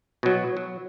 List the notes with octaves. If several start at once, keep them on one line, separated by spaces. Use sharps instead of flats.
B2 F#3
F#3